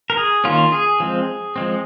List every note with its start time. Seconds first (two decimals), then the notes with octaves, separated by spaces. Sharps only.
0.10 A#4
0.17 G#4
0.44 D#3 A#3 C#4 F4
0.72 G#4
1.00 F3 G#3 C4
1.56 F3 G#3 C4